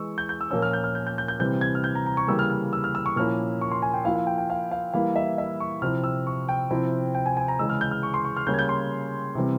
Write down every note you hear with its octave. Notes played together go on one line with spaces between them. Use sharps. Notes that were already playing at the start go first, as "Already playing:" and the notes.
Already playing: E3 G#3 E4 C#6 E6
G6
G6
E6
A#2 F3 A#3 C#4 E6
F6
G6
F6
G6
G6
G6
G6
C3 E3 G3 C4 G6
G#6
F6
G6
A#5
A#5
C#6
C#3 E3 G3 A#3 E6
F6
F6
E6
F6
E6
C#6
A#2 F3 A#3 C#4 E4 F6
C#6
C6
G#5
G5
F3 A#3 E4 F5
F5
G5
G5
F5
F5
E3 G3 A#3 E4 F5
E5
E5
C#6
C3 F3 C4 E4 F6
E6
C#6
G5
C3 F3 C4 E4
G5
G#5
G#5
A#5
C#3 E3 G#3 E6
F6
G6
F6
C#6
C6
C#6
F6
C#3 G3 A#3 C#4 G6
G#6
G6
C6
C3 E3 G3 C4